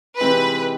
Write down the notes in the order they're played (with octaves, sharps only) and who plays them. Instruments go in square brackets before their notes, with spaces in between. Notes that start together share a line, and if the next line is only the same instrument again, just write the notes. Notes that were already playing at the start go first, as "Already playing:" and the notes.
[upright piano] C3 E3 G#3 C4 D#4 [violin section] B4